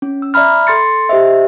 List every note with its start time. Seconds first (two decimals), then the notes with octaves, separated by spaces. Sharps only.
0.02 C#4
0.22 E6
0.34 D5 E5 A#5 B5 F6
0.67 A4 C6 A6 C#7
1.09 G4 C5 D#5 E5